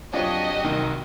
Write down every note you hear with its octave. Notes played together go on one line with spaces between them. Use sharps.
F2 F#3 D4 F#4 G4 C#5 D#5
C2 D#3 A#5